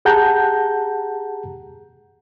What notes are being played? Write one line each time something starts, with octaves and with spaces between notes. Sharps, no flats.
G4 G#4 F#5 A5 A#5 G6